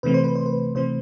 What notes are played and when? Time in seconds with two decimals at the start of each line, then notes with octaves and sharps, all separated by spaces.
0.03 C3 E3 A3 C4 B4
0.14 C5
0.24 B4
0.35 C5
0.46 B4
0.75 C3 E3 A3 C4 C5